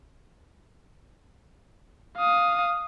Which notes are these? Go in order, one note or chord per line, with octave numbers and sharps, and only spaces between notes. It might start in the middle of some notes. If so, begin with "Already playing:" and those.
F5 D#6